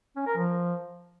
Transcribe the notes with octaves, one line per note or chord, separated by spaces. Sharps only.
C#4
A#4
F3